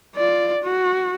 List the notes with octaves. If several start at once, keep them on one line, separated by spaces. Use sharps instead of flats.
F4 D5
F#4